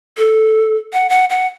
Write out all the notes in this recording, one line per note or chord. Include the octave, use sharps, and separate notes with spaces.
A4
F#5
F#5
F#5